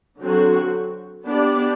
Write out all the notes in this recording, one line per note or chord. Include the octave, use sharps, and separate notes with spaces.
D3 F#3 C4 F#4
B3 D4 G4 D5